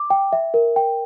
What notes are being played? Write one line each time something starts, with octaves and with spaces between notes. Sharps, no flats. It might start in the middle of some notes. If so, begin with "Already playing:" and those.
Already playing: D6
G5
E5
A#4
G5